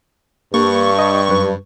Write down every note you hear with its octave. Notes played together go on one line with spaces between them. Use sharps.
G2 A#3 C#6
D#5
F#2 B4